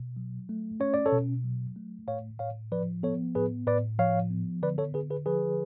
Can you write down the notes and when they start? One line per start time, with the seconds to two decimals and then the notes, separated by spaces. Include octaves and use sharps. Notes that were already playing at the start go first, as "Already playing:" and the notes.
Already playing: B2
0.17 F#3
0.49 A3
0.80 C#4 C#5
0.94 D5
1.06 A4 C#5
1.12 B2
1.44 F#3
1.76 A3
2.07 A2 C#5 F5
2.39 A2 C#5 F5
2.72 F3 B4 D5
3.03 B3 A4 C#5
3.35 A2 G#4 B4
3.67 A2 B4 D5
3.99 F3 C#5 F5
4.30 B3
4.62 D3 B4 D5
4.78 A4 C#5
4.94 D3 G#4 B4
5.10 G#4 B4
5.26 F3 G#4 B4